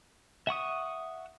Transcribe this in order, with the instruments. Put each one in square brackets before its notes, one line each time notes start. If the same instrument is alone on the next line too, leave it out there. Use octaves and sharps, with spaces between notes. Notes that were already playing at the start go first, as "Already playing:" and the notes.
[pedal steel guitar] E5 F#5 C#6 D#6